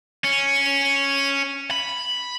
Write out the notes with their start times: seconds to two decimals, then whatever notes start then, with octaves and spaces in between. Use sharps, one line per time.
0.24 C#4
1.71 B5